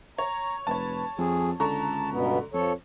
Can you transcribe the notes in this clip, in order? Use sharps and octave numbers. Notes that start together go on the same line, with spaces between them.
C#5 A#5
F1 B4 C#5 A5
F2 G#4
C#2 D3 A5 A#5 C#6
G2 B2 B3
F2 F3 A4 C#5